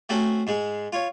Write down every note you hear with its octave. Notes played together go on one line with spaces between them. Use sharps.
A3 C4 C#4 F#4
G#2 G#3
F4 C#5